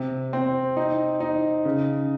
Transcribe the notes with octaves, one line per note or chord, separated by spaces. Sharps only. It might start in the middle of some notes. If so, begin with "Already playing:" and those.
Already playing: C3
C4
D#4
D#4
C#3